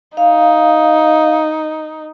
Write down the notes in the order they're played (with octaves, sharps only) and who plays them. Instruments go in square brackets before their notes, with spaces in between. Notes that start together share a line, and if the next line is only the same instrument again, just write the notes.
[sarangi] D#4 [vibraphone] F5